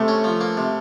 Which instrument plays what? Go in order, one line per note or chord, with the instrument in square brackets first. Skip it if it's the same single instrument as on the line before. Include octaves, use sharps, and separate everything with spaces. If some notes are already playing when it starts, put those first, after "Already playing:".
Already playing: [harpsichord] C3 [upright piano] A3
[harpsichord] C#4
F3
A#3
C3